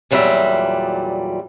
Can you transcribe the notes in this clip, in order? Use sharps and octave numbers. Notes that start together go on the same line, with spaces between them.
E2 A#2 F#3 G3 D5 E5